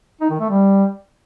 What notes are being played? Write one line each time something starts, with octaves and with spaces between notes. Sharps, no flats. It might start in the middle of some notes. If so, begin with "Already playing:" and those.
D#4
D#3
A3
G3